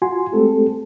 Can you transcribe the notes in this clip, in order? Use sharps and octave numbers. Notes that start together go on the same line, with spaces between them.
F4 F#4 G#5 C6
G#3 A3 C4 G4 A4